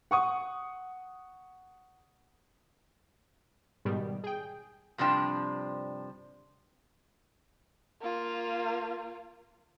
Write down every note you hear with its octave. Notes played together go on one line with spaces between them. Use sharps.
F#5 C#6 D#6
G#2 B2 D#3 G3
G#4 G5
G2 C3 F3 D4 G5
A#3 F4